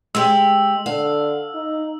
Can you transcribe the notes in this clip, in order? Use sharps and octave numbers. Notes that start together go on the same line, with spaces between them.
G#3 G4 E6
D3 F5
D#4